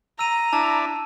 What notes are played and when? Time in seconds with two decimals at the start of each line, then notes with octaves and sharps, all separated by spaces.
0.19 A#5 E6 D#7
0.53 D4 E4 A5